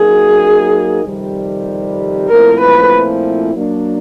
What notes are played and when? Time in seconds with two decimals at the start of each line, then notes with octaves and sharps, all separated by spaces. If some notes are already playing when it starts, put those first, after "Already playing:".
Already playing: F#3 A#3 D#4 F#4 G#4 A#4
1.03 F2 C3 D#3 G3
2.29 A#2 F3 A3 C4 E4 A#4
2.60 B4
3.54 F#3 A#3 D4